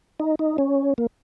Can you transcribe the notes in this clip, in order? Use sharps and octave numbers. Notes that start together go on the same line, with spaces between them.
D#4
D#4
C#4
A#3